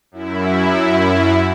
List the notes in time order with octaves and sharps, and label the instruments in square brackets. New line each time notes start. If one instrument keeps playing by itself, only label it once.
[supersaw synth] F#2 E4